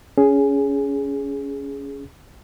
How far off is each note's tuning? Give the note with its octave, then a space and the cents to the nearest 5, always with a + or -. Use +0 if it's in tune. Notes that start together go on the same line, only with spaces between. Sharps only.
C#4 +20 G#4 +0